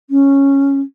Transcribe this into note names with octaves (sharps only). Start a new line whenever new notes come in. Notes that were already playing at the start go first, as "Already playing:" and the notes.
C#4